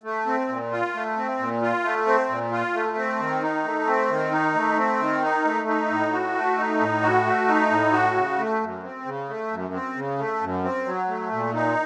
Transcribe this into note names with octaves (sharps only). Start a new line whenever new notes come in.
A3
C4
A#2
F4
A3
C4
A#2
F4
A3
C4
A#2
F4
A3
C4
D#3
D#4
A3
C4
D#3
D#4
A3
C4
D#3
D#4
A3
D#4
A2
F#4
A3
D#4
A2
F#4
A3
D#4
A2
F#4
C#3
A3
F#2
C4
C#3
A3
F#2
C4
C#3
A3
F#2
C4
F#3
A3
A#2
D#4